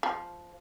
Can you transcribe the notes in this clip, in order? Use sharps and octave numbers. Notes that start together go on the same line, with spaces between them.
F3